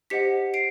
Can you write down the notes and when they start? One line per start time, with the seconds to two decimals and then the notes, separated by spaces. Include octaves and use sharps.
0.10 G4 C5 D#5 F#5 B6 C#7
0.54 C7 D7